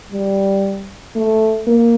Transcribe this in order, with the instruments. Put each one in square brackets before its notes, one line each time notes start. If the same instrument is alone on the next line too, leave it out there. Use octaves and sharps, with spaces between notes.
[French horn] G3
A3
A#3